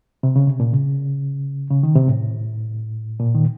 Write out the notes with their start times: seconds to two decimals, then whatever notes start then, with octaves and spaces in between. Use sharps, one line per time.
0.23 C3
0.36 C#3
0.47 C3
0.60 A#2
0.72 C#3
1.71 C#3
1.83 D#3
1.95 C3
2.08 A2
3.20 A#2
3.35 D#3